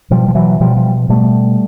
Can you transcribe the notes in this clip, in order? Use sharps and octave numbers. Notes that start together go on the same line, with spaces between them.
B2 F3 G3
F3
E3 F#3
B2 F3 G3
F3 G3
B2 G3 A3